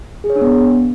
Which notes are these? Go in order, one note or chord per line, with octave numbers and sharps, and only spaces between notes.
G#4
C#5
D4
B3